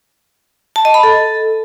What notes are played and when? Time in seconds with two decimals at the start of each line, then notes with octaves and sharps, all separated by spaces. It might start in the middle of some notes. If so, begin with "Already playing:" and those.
0.76 A5
0.85 D#5
0.94 B5
1.03 A4